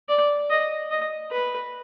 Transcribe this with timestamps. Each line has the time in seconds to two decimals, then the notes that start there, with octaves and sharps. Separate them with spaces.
0.09 D5
0.50 D#5
0.91 D#5
1.31 B4